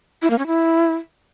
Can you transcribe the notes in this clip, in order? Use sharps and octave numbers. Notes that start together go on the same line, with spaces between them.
E4
A#3
C#4
E4